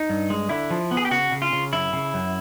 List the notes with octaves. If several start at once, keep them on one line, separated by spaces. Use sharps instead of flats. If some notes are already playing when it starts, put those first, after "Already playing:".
Already playing: D#4
G2
G#3
D3 E4
F3
B3
G#4
G4
C#3 F#4
C#3
F4
C#3
F#2 E4
C#3
F#2